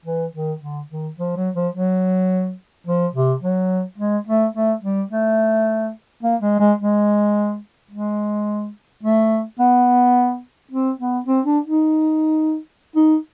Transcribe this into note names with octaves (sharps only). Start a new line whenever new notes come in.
E3
D#3
D3
D#3
F3
F#3
F3
F#3
F3
C3
F#3
G#3
A3
A3
G3
A3
A#3
G#3
G#3
G#3
G#3
A3
B3
C4
B3
C4
D4
D#4
D#4